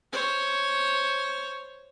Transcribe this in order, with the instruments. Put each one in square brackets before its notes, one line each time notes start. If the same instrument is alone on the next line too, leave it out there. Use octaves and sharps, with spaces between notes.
[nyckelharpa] C5 C#5